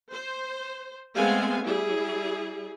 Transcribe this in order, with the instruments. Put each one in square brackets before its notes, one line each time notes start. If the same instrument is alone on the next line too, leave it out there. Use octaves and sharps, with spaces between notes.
[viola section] C5
G#3 A3 B3 C4 F5 G#5
G3 E4 G#4